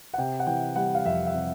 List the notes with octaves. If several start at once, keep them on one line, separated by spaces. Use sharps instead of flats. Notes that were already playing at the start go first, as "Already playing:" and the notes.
F#5
C3 G5
F#5
E3 G5
G3 F#5
F5
F2 E5
E5
C3